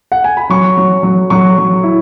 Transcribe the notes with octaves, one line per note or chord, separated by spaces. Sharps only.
F#5
G#5
B5
F#3 C#6
F#3
F#3
F#3 C#6
F#3
E4